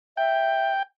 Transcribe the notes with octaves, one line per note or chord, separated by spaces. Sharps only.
E5 G5